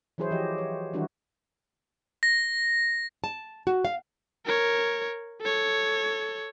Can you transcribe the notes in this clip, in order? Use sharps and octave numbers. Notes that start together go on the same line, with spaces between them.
E3 F#3 E4 G#4 C5 C#5
E3 F3 G4 D#5
C#5
D#3 E3 G3 D4 E4 F#4
A#6
A5
F#4
F5
A#4 C#5
A4 C#5